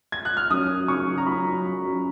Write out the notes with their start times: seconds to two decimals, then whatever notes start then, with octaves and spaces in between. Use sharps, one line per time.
0.12 G#6
0.25 F#6
0.37 F6
0.50 F#2 D#6
0.70 F#2
0.88 C#3 C#6
1.07 F#3
1.18 A#5
1.27 F#2 B5
1.46 F#2
1.65 F#2
1.84 F#2